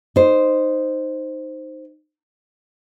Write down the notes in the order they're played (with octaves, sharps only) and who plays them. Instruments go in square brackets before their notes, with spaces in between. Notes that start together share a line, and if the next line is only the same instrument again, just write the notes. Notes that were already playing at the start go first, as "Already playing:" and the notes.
[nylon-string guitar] D#4 C5